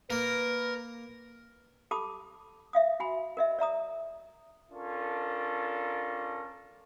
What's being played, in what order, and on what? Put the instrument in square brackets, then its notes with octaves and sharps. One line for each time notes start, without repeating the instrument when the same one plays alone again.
[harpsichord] A#3 [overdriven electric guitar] A#4 [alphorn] B4
[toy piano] G4 A4 A5 B5 D6 D#6
E5 F5 D#6
F#4 G#5 B5
A#4 D#5 E5
D5 E5 A#5 D#6
[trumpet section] C#4 D4 F4 A4 A#4